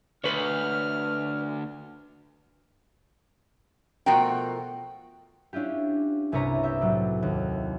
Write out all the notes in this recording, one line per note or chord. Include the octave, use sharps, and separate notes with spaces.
D2 B4 C#5 F6
B2 F3 A3 F#4 A#4 G5
C#4 D4 E4 F4 G4
G1 C2 E4 B4 C#5 A#5
G4 E5
A2 F#3 A4 D5
D#2